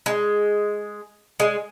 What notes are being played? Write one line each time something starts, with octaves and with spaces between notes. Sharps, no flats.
G#3
G#3